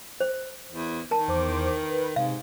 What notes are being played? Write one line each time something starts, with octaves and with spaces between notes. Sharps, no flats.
C5
E2
D#3 A#4 A5
E2 C5 D6
B4
G#2 C3 F5